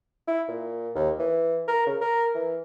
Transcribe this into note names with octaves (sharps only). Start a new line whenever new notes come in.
E4
A#2
D#2
E3
A#4
C#3
A#4
E3